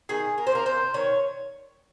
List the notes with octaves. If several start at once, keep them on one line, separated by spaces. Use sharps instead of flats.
D#3 G#4
A#4
C5
A#3 A#4
C5
D#3 C#5